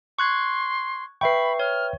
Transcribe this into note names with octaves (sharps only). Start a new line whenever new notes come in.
C6 C#6 F#6 G#6
B4 E5 G5 B5 C#6 C7
C#5 F6